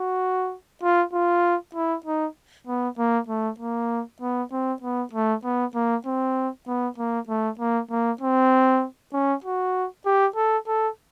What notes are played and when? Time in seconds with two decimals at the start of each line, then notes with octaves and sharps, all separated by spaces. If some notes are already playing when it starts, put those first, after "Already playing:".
Already playing: F#4
0.83 F4
1.13 F4
1.75 E4
2.05 D#4
2.67 B3
2.98 A#3
3.29 A3
3.60 A#3
4.21 B3
4.52 C4
4.82 B3
5.13 A3
5.44 B3
5.75 A#3
6.06 C4
6.67 B3
6.98 A#3
7.28 A3
7.59 A#3
7.90 A#3
8.21 C4
9.13 C#4
9.44 F#4
10.05 G4
10.36 A4
10.67 A4